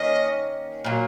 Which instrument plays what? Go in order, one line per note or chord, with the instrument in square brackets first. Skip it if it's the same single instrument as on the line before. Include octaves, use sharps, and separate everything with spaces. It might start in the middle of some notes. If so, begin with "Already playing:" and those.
Already playing: [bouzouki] D#3 A#3 C#4 [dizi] D#5
[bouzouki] A#2 F#3 A#3